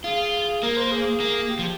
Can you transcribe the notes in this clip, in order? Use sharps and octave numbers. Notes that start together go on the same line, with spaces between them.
F4 G#4
A#3 A#4
C5
G#4
A#3
G4
F3